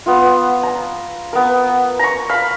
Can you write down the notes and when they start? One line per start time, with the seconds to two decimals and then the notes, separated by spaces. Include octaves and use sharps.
0.06 B3 F4
0.63 A#5
1.33 B3 A#4
1.99 A#5 C#6
2.29 F5 B5